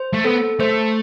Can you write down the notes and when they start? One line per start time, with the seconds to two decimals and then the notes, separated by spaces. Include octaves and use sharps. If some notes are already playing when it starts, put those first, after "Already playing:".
Already playing: C5
0.13 A3
0.24 B3 A4
0.60 A3 C5